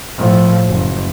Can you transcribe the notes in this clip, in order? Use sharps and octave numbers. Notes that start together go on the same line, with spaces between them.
A2 F3
F#1